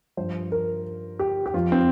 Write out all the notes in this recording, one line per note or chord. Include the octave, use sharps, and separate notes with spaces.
G2 F3 C5
A#4
G4
G4
F2 F3 F4
C4